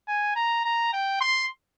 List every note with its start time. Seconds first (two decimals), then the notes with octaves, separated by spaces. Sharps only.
0.08 G#5
0.36 A#5
0.65 A#5
0.93 G5
1.21 C6